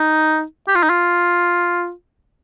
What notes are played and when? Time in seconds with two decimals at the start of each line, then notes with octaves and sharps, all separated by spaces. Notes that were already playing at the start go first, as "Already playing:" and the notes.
Already playing: D#4
0.68 G4
0.75 F4
0.83 D#4
0.90 F4